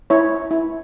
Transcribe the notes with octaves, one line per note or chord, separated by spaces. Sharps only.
E4 C#5
E4